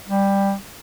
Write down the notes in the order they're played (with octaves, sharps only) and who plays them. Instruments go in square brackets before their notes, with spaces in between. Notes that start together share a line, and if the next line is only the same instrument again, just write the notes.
[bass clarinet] G3